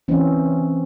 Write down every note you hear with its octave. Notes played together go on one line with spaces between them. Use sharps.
E3 C4 C#4